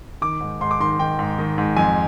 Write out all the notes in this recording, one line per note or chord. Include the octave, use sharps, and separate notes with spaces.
D#3 D6
G#2
G#2 C6
D6
D#3 C6
D#3 G5
G#2
D#3
G#2
F2 G#5